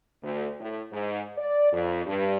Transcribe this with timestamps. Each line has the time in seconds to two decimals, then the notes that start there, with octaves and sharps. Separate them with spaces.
0.22 D2
0.59 A2
0.91 G#2
1.37 D5
1.71 F2
2.06 G2